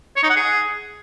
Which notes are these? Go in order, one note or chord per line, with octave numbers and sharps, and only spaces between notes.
C#5
D#4
F#5
G#4